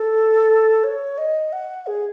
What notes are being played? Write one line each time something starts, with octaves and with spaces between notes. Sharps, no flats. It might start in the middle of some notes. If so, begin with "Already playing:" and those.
Already playing: A4
C#5
D#5
F#5
G#4